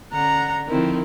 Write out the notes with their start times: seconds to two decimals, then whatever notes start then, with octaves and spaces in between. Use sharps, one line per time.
0.12 D3 C#4 D4 F#5 A#5
0.68 D3 D#3 F3 C4 E4